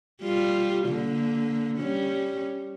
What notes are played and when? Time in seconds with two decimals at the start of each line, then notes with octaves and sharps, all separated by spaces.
0.23 G3 F4
0.87 D3 A#3
1.78 G3 C#4